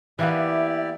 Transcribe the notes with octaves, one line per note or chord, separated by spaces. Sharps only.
E3 A#3 B3 E4 G4 D5 E5